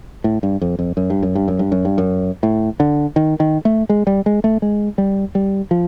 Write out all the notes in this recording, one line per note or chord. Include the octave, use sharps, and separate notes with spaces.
A2
G2
F2
F2
F#2
G2
F#2
G2
F#2
G2
F#2
G2
F#2
A2
D3
D#3
D#3
A3
G#3
G3
G#3
A3
G#3
G3
G3
F3